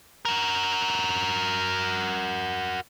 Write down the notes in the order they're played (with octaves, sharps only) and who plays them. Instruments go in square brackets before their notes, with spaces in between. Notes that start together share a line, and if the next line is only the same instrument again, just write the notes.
[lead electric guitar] F#4 A#4